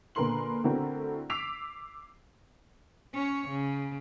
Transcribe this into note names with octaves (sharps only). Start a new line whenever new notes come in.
A#2 D3 A#4 B4 C6 F#7
D3 A3 C4 E4 F#4 A#4
D6 E6 B6 C7 D7 F7
C#4 C#5
C#3